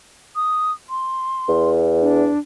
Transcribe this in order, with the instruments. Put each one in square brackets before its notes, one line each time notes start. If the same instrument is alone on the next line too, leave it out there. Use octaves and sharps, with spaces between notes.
[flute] D#6
C6
[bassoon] E2
[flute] D4